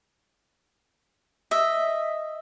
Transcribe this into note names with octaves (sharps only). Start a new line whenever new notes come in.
D#5 E5